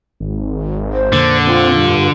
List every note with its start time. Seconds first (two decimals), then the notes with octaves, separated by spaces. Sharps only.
0.20 G#1
0.93 C5
1.13 F2 A#2 D3 A#3
1.47 C4 F4
1.77 G2